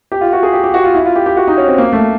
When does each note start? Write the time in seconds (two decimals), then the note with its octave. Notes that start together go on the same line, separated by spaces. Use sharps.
0.12 G4
0.21 F4
0.33 F#4
0.43 G#4
0.53 G4
0.64 G4
0.74 F#4
0.84 F4
0.95 E4
1.06 F4
1.16 G4
1.26 G4
1.37 F#4
1.47 D#4
1.58 C#4
1.67 C4
1.78 A#3
1.93 A3